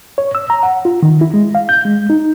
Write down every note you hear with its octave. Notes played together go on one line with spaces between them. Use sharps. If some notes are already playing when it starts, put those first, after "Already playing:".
C#5
E6
A#5
F#5
F4
D#3
E4
G#3
F5
G6
G#3
D#4